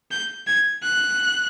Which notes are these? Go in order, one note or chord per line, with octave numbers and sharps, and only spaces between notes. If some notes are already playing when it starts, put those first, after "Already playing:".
G6
G#6
F#6